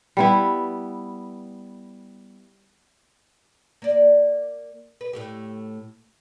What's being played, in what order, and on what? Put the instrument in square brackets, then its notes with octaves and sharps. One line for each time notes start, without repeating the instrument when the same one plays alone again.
[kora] G3 B3 E4
[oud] A#3 D5
B4
A2 A3 G4